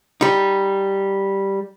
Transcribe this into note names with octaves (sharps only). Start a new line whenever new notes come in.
G3 D#4